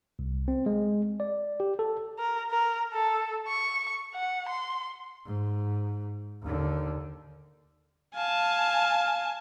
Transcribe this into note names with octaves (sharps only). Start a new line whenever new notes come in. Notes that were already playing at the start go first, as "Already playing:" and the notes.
C2
C4
G#3
D5
G4
A4
A#4
A#4
A4
C#6
F#5
C6
G#2
D#2 D3
F5 G#5 A5